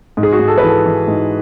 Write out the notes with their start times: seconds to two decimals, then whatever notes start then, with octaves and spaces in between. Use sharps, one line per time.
0.17 G#2
0.23 G#4
0.33 F#4
0.40 G#2
0.48 A4
0.58 B4
0.63 E3 A4
0.86 E3
1.08 G#2